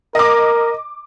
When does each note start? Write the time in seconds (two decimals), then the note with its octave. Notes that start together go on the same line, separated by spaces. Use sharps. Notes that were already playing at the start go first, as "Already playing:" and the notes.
0.15 A#4 D#5 D6